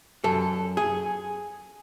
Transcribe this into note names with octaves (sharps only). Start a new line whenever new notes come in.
F#2 A4
G#4